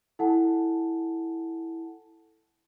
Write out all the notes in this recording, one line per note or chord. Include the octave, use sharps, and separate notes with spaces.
E4 A4 F#5 G#5 A5